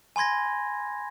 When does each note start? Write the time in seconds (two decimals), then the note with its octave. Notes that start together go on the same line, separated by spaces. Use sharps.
0.16 G#5 B5 C6 G#6 A#6